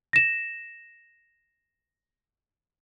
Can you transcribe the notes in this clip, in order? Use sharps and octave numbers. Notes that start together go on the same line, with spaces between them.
A#6 E7